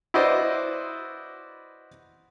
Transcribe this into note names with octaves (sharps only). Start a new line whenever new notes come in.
E4 F#4 B4 C5 D5 D#5